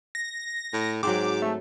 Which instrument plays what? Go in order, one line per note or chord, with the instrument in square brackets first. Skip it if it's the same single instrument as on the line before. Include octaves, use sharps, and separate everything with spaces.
[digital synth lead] A#6
[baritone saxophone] A2
[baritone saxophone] G#2 [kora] F#3 C4 [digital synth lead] D6
[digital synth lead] A3